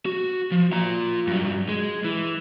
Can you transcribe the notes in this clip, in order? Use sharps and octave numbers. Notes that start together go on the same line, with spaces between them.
F#4
F3
F4 A#5
G2 F#3
G#3
E3